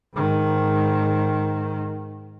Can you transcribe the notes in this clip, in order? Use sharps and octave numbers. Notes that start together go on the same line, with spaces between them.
G#2 D#3